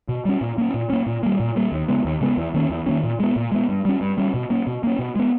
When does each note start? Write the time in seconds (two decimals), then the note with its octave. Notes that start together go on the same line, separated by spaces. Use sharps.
0.09 B2
0.25 G3 C#4
0.41 A#2
0.58 A#3 C#4
0.74 A#2
0.90 A#3 C#4
1.06 A#2
1.23 G3 A#3
1.40 A#2
1.56 G3 A#3
1.72 D#2
1.88 C#3 G#3 B3
2.05 D#2
2.21 C#3 G#3 B3
2.37 E2
2.54 D#3 A#3 C#4
2.70 E2
2.86 D#3 A#3 C#4
3.04 A#2
3.20 G#3 B3
3.36 A#2
3.52 G#3 B3
3.69 G2
3.85 G3 C#4
4.01 G2
4.18 G3 C#4
4.34 B2
4.50 A#3 C#4
4.67 B2
4.83 A#3 C#4
4.99 B2
5.16 G#3 B3